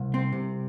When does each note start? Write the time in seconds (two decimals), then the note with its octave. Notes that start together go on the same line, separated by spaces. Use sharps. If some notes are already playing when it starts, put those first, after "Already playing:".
Already playing: C2
0.14 C4
0.32 C3